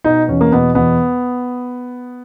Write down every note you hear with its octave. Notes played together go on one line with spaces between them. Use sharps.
B2 D#4
E2 C#4
A#3
B2 B3
E2 B3